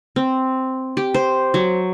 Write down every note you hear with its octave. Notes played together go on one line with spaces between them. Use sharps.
C4
G4
C5
F#3